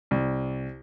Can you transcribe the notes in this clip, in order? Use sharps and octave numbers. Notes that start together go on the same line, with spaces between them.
C2